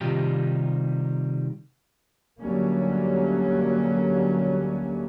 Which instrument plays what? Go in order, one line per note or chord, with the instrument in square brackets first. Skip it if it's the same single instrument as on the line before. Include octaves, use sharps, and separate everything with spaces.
[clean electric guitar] C3 D#3 G3 D#4 F4 G4
[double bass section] D2 D3 F#3 G3 A#3 C#4